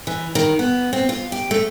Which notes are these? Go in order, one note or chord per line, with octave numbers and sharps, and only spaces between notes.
E3
D#3
B3
C4
F4
G4
A3